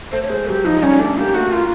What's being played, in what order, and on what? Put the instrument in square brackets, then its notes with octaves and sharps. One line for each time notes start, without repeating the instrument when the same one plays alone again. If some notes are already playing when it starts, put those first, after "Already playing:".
[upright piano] A3 [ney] C5
[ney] C#5
[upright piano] G#3 [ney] C5
[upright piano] F#3 [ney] G4
[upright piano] F3 [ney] D#4
[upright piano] G3 [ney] C#4
[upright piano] A3 [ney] D4
[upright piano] A#3 [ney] G4
[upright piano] A3 [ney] F#4
[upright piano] A#3 [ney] F4